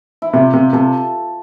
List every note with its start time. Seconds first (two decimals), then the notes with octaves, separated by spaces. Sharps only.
0.22 E4
0.33 C3 F4
0.53 C3
0.73 C3 A4